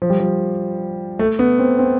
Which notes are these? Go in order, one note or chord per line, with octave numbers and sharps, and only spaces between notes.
F3
G3
F3
A3
B3
C4
C4